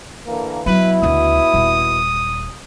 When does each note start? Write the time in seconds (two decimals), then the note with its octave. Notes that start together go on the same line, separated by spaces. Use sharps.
0.27 D3 E3 A#3
0.66 B2 F#3 E4 B4
1.02 D2 C#3 D#6
1.54 D#1